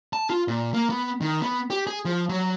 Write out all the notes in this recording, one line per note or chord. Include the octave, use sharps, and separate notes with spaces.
A5
F4
A#2
A#3
B3
D#3
B3
G4
G#4
F3
F#3